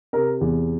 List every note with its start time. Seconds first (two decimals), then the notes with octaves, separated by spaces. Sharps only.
0.13 C3 A#4
0.41 E2